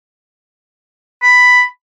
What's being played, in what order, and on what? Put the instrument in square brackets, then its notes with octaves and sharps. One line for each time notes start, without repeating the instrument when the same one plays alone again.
[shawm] B5